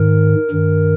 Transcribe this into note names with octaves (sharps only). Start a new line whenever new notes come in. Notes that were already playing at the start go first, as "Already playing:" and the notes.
Already playing: G#2 D#3 A#4
G2 D#3